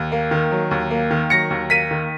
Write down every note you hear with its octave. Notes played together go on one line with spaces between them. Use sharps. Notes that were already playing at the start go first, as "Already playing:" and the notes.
Already playing: D#2
A#3
D#3
F#3
D#2
A#3
D#3
F#3 A#6 C#7
D#2
A#3 B6 D#7
D#3